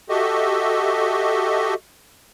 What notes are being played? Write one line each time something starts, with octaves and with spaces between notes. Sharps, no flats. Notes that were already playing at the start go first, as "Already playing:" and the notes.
F#4 G4 A4 D#5 E5